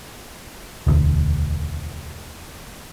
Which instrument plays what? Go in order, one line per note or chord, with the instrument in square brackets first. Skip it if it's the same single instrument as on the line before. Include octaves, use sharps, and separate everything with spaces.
[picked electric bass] E1 D2